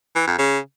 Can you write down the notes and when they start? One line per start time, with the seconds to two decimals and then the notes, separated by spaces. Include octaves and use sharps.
0.16 E3
0.27 F2
0.38 C#3